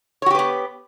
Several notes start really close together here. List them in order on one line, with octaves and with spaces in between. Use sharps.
C#5 F#4 G4 B4 B3